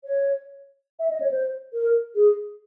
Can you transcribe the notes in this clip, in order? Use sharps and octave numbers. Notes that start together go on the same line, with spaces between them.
C#5
E5
D#5
C#5
C5
A#4
G#4